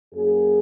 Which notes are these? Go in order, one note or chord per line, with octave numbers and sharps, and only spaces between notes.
F#2 F#3 A#3 G#4